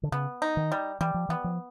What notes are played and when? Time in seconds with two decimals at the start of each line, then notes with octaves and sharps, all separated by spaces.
0.03 D3
0.12 C#3 B3
0.42 D#4
0.57 D#3
0.72 G3
1.00 E3 G3
1.14 F3
1.29 E3 B3
1.44 F3